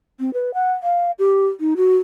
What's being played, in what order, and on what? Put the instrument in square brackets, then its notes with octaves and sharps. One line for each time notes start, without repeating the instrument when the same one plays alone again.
[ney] C4
B4
F#5
F5
G4
D#4
F#4